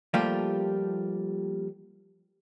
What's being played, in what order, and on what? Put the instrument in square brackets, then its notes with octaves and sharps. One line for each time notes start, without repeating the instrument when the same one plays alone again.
[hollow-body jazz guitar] F3 G3 A3 A#3 F4 G4